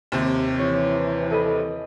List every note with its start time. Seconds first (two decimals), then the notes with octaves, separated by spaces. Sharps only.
0.12 D#2 C3
0.59 E3 C#5
1.30 A4 D#5 B5